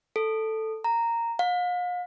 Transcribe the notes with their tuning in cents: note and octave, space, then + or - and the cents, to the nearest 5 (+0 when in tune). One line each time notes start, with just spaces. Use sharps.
A4 +5
A#5 -10
F5 +40